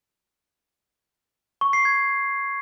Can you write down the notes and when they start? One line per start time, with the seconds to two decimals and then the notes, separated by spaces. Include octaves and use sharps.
1.61 C#6
1.73 C7
1.85 G#6